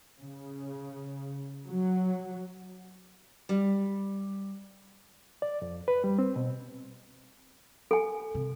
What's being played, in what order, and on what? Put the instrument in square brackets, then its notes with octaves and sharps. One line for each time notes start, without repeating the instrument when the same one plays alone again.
[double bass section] C#3
F#3
[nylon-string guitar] G3
[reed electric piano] D5
F2
B4
G3
C4
B2
[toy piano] A4 G#5
[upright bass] C3